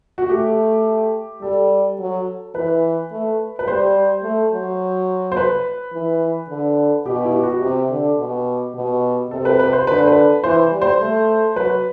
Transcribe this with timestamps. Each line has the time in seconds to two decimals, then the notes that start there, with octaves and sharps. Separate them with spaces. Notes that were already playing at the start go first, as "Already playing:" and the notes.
0.18 F#4
0.29 A3 G4
1.42 G3 A4
1.99 F#3
2.55 E3 B4
3.12 A3
3.59 B4
3.67 G3 C5
4.23 A3
4.52 F#3
5.32 C5
5.37 B4
5.93 E3
6.49 D3
7.06 B2 G4
7.24 E4
7.35 G4
7.43 F#4
7.62 C3 G4
7.90 D3
8.18 B2
8.75 B2
9.31 C3 A4
9.45 B4
9.60 B4
9.73 C5
9.87 D3 B4
9.98 C5
10.08 B4
10.44 E3 C5
10.72 G3
10.82 C5
11.01 A3
11.56 F#3 B4